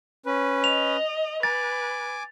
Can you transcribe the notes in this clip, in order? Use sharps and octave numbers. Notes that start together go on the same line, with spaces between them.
C#4 B4
D#5 F7
B4 G#5 D6 A6